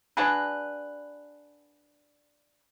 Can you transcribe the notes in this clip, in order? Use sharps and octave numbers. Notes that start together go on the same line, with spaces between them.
D4 F#4 G#4 B4